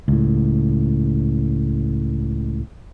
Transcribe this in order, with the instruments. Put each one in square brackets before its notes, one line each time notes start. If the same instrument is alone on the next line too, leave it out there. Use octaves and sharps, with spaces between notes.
[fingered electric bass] C#2 A2